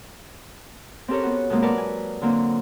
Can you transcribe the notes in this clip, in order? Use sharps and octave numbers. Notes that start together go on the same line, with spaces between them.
C4 C#4 G4 A4 A#4 C#5
B3 F#4
B2 F#3 G#3 A#3 C4
A#4 B4 D5 F#5 A5
G#5
D3 F#3 A#3 C4